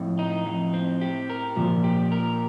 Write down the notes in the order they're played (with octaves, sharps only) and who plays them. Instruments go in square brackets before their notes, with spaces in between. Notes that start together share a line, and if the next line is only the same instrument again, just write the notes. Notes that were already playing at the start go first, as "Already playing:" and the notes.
Already playing: [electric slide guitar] F2 [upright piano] A2
[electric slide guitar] D#4
F2
C4
G4
A#4
[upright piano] A#1 A#2 [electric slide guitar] F3
[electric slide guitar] G4
A#4